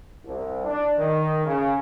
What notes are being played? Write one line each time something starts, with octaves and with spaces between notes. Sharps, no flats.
C2
D4
D#3
C#3